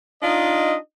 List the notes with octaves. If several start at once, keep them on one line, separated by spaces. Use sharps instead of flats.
D4 D#4 F4 D#5